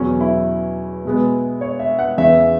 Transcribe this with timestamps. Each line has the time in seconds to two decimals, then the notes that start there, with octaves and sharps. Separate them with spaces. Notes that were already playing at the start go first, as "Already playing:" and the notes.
Already playing: E2 B2 F#3 B3 C#4
0.21 E4
1.05 B2 G#3 B3
1.61 C#5
1.79 E5
1.99 F#5
2.17 E2 C#3 E3 E5